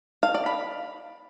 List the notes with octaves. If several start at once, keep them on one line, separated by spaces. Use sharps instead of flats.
F5
D5
B5